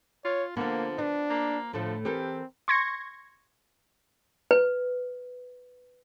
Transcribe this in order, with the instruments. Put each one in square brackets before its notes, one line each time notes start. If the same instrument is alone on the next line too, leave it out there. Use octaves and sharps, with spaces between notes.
[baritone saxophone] F4 [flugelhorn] C#5
[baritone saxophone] D3 [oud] F3 B3 [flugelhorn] A#3
[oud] B3 [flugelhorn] D4
[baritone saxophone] A#3
[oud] A2 A3 [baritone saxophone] D3 [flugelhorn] F3
[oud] E3 A4 A#4 [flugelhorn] C4 [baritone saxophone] G4
[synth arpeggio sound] C6 C#6 G#6 A#6 C#7
[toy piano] B4